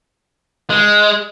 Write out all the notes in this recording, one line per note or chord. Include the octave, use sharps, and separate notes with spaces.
G#3